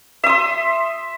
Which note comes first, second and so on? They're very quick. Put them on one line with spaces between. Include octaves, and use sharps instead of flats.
E5 D#6 C6